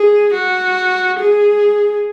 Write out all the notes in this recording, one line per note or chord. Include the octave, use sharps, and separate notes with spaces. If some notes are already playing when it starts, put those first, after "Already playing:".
Already playing: G#4
F#4
G#4